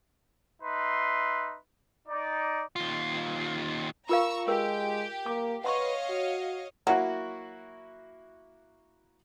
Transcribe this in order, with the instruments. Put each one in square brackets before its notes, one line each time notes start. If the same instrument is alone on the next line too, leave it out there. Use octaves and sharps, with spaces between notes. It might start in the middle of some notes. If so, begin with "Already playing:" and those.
[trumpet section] D#4 B4 E5 C6
D#4 D5
[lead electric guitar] D#2 F4
[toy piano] F4 A#4 F5 [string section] A#5 C#6 E6
[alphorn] G#3 [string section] G4 [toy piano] A#4
[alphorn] A#3 [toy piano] D6
[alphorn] B4 [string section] C#5 D#5 F5 [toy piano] F#5 C6 C#6
[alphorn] F#4
[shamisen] F#3 [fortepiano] A#3 E4 F#4